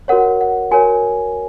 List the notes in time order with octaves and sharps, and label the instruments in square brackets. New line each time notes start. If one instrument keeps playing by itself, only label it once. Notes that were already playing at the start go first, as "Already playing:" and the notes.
[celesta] F#4 A#4 C#5 F#5
F#5
F#4 A#4 C#5 G#5